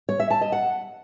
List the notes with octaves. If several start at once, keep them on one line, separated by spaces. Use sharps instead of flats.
C#5
E5
A5
D#5
F#5